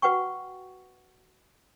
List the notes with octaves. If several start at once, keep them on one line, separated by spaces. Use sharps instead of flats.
F#4 B4 F#5 G5 C#6